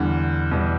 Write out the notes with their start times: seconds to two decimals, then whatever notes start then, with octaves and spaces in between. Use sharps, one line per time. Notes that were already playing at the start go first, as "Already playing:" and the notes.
Already playing: E2 D3 G3
0.51 E2 B2 G3